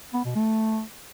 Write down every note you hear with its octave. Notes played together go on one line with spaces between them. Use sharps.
B3
B2
A3